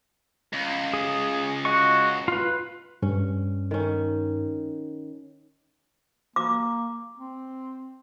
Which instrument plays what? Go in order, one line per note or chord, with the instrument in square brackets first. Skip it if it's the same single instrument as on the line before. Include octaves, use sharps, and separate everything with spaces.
[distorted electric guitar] C#2
[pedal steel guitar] G#4
F#4 D#5 C#6
F4 B4
[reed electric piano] G2 [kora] C#4
[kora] D#3 C#4
[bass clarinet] A#3 [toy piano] D6
[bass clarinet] C4